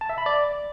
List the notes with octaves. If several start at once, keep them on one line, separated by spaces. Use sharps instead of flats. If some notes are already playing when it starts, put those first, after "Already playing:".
A5
E5
B5
D5